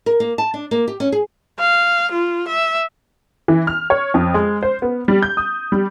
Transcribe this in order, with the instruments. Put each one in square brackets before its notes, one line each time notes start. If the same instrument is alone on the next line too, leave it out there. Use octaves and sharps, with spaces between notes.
[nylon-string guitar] A#4
A#3
A5
D4
A#3
G4
C#4
G#4
[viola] F5
F4
E5
[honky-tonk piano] E3
F6
C#5
F2
G#3
C5
B3
G3
G6
D#6
G3